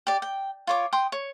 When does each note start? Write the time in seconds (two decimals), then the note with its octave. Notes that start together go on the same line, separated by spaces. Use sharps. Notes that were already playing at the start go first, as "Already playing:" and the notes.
0.07 G4 D5
0.22 G5
0.67 F4 C#5 D6
0.93 G5 C6 D#6
1.12 C#5